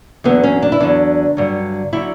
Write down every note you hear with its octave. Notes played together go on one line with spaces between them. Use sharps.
E2 D3 F#3 B3
C#4
D4
E4
E2 D3 F#3 D4
G2 D3 F#3
D3 F#3 E4